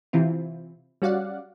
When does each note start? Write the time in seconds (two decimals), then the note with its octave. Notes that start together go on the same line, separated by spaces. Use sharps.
0.13 C3 E3 C4 E4 F4
1.02 G3 C#4 F#4 D5 F5 F#5